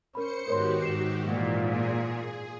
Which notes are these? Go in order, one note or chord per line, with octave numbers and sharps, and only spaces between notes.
C#4 A#4 C5 B5 C#7
G#2 D#3 B3 F#4 G4 A#4 C#5 C6
G#2 C7 E7
A#2 E3 F#5
G#4